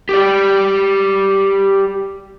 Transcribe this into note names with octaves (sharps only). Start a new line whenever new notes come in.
G4 D5